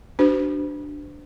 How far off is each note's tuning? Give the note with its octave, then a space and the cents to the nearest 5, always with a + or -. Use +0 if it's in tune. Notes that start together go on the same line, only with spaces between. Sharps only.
D4 +0 F#4 +35 C5 -45